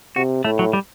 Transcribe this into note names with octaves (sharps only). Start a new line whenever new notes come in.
C3 F#4
A2 A3
F#3
G3